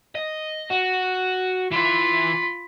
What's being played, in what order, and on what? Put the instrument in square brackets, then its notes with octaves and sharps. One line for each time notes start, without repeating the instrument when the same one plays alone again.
[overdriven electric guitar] D#5
F#4
[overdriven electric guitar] E3 [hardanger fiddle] F4 B5